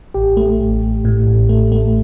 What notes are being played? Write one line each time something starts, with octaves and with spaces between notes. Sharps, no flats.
A1 G4
A3
A1
A1
A2
A1
A3
A3